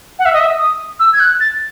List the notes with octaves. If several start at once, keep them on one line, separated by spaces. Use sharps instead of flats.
F#5
E5
D#5
E5
D#6
E6
G#6
F#6
A6